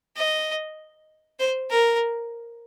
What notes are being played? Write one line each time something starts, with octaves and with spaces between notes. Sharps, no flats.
D#5
C5
A#4